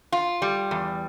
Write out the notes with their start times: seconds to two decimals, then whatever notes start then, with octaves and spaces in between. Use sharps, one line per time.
0.12 F4
0.42 G3
0.71 E2